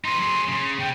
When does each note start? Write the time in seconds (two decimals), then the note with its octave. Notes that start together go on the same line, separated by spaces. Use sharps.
0.05 D#4 B4 C6
0.18 F#3 G#4
0.49 C#3
0.79 C#3 G5